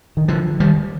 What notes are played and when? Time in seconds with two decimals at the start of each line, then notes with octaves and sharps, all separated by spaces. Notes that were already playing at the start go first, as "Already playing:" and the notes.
0.17 D#3
0.28 D3 F3
0.60 D#3 G3